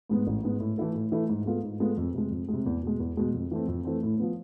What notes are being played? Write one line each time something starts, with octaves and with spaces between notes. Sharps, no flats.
G#2 G#3 B3
A1
G#2 G#3 B3
A2
E3 A3 E4 A4
A2
E3 A3 E4 A4
G#2
G#3 B3 F4 A4
G#2
G#3 B3 F4 A4
F2
C3 G#3
F2
C3 G#3
E2
B2 G#3
E2
B2 G#3
F2
E3 A3 C4
F2
E3 A3 C4
A2
F3 B3